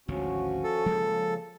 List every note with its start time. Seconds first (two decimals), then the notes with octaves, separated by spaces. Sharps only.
0.08 G#1 D2 C#3 F3 C#4 F#4
0.64 A4
0.86 C#3 F3 G#3 A#3